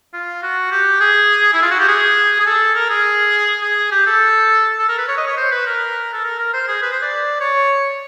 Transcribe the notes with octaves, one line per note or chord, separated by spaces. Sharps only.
F4
F#4
G4
G#4
E4
F4
F#4
G4
G#4
G#4
A4
A#4
G#4
G#4
G4
A4
A4
A#4
B4
C#5
D#5
C#5
C5
B4
A#4
A4
A#4
A#4
C5
G#4
B4
C5
D5
C#5